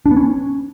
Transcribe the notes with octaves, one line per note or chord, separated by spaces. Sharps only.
D4
B3
C#4